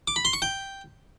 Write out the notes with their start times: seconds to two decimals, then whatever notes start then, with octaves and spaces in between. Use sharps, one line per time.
0.08 D6
0.16 B5
0.25 C6
0.33 C#6
0.42 G5